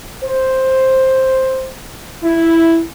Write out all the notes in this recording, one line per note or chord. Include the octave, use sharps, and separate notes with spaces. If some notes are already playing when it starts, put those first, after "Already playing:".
C5
E4